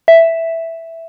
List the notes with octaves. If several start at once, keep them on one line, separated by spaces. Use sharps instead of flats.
E5